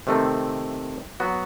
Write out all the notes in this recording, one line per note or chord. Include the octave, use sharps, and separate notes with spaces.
C3 D#3 A3 C4
F#3 B3 F#4